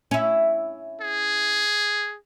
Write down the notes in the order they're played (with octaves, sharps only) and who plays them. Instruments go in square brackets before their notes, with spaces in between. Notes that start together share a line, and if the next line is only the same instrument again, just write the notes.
[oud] C#4 E4
[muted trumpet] G#4